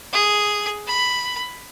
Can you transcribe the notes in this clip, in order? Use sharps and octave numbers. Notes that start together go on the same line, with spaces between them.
G#4
B5